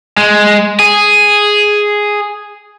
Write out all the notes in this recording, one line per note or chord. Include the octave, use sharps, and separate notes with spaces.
G#3
G#4